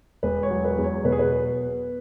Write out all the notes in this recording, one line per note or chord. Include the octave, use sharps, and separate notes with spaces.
E1 B4
C#5
F#3
B4
E2
C#5
B2 B4
G#4
B4